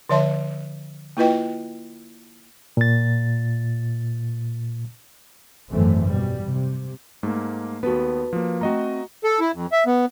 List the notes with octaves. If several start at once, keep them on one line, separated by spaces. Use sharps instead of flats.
D3 F3 C#5 E5 A5 C6
A#3 E4 F4 B4 D#5 G5
A#2 A6
G#1 F#2 D3 E3 A3 C4
B2 G3
C3
G#2 A3 A#3
D#2 B3 F#4 A4 B4
F3 A#3
A3 C4 F#4 D#5 A#5
A4
E4
F2
E5
B3